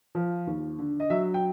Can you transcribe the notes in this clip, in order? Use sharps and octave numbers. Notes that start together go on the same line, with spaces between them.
F3
D#2
D3
D#5
F#3 E5
G5